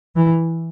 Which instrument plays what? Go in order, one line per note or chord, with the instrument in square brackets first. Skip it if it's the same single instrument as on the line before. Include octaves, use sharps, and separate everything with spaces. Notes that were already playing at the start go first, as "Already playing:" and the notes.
[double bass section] E3